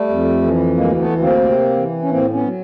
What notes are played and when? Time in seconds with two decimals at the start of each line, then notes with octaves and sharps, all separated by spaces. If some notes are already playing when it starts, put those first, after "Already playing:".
Already playing: G3 A3
0.09 F2
0.42 E3
0.76 D2 G#3 A#3
0.98 A3 B3
1.10 D2
1.21 A#3 C4
1.43 C3
1.76 E3
2.02 C#4
2.10 A2 A#3 C4
2.33 B3 C#4
2.44 F#3